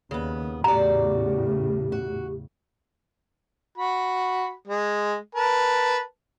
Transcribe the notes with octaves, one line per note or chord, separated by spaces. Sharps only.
D#2 C#3 B3
E2 A2 C#3 F#4 G4 D5 A#5
F#4
F#4 B5
G#3
A#4 B4 A5